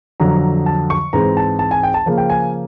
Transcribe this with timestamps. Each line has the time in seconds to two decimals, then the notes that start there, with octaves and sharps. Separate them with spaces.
0.20 F2 D3 F#3 A#5
0.66 A5
0.90 C#6
1.13 G#2 E3 G#3 C4 A#5
1.37 A5
1.59 A5
1.71 G#5
1.83 G5
1.94 A5
2.06 C#3 F3 A#3
2.18 G5
2.30 G#5